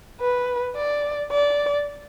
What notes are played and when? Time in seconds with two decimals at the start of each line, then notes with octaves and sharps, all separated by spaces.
0.20 B4
0.76 D5
1.31 D5